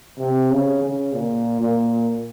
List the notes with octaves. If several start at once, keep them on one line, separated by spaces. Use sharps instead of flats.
C3
C#3
C#3
A#2
A#2